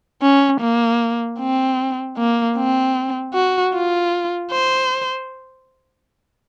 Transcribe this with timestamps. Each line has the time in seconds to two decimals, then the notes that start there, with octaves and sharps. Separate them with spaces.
0.22 C#4
0.61 A#3
1.40 C4
2.18 A#3
2.57 C4
3.34 F#4
3.74 F4
4.52 C5